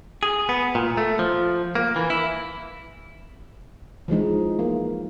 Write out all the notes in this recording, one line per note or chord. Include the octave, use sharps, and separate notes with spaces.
G#4
B3
A#2
A3
F3
A#3
E3
E4
E3 F3 G#3 D#4
A#3